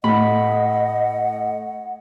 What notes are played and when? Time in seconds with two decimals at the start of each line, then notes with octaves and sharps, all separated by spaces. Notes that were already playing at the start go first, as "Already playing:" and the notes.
0.04 A2 D#5 F#5 B5